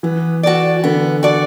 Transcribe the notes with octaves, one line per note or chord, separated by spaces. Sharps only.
E3 B3
F#4 A4 D5
D3 B3
F#4 A4 D5